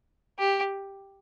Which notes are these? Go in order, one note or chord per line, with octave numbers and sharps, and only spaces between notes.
G4